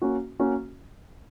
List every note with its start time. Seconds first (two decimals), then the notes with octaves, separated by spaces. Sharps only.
0.02 A#3 C#4 F#4
0.39 A#3 C#4 F#4